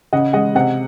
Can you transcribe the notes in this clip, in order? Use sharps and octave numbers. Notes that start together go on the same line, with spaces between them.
C#3 D#5 F#5
G#3 D#5 F#5
C3 D#5 F#5